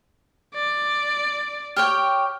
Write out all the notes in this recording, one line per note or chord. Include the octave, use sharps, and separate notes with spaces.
D5
G4 C#5 G5 F6